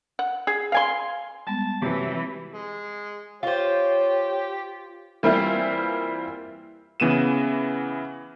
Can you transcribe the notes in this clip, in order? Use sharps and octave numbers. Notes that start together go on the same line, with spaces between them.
F#5
G#4
F5 G#5 C6
G3 G#3 B3 A5
C3 E3 F#3
G#3
F4 G4 C5 C#5
E3 G3 A#3 C4 E4 F4
C#3 E3 B3 D#7 E7